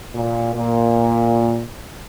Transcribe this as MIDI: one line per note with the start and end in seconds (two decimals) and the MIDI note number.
0.15 0.52 46
0.54 1.64 46